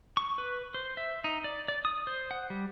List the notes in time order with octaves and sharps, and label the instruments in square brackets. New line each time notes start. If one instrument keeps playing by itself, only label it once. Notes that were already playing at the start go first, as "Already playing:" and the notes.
[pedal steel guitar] C#6
B4
C5
E5
D#4
D5
D5
D#6
C5
F#5
G3